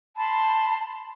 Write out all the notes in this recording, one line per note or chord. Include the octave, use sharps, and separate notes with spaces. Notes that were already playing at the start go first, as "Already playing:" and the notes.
A5 B5 C6